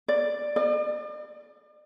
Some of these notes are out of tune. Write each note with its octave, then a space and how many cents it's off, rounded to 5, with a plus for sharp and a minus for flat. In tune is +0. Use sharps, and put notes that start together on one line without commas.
D5 +10
D5 +45